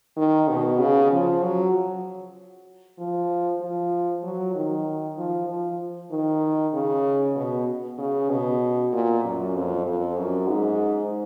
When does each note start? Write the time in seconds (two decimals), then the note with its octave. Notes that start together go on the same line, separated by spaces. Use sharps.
0.17 D#3
0.48 B2
0.79 C#3
1.11 F3
1.42 F#3
2.98 F3
3.61 F3
4.23 F#3
4.55 D#3
5.17 F3
5.48 F3
6.11 D#3
6.73 C#3
7.36 B2
7.98 C#3
8.30 B2
8.92 A#2
9.24 F#2
9.55 F2
9.86 F2
10.17 F#2
10.48 G#2